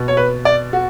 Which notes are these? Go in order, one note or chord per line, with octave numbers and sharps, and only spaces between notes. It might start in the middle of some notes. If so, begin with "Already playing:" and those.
Already playing: B2
C#5
B4
D5
F#4